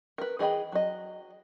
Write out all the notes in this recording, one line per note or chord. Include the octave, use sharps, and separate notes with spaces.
A#4 B4
E3 G#4 D#5 G5 B5
F#3 D#5